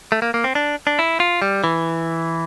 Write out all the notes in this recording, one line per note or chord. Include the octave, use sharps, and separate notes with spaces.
A3
A#3
A#3
C4
D4
D4
E4
F4
G3
E3